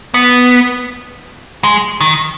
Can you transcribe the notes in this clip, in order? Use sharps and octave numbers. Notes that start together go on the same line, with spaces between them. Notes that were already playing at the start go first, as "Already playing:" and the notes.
B3
G#3
D#3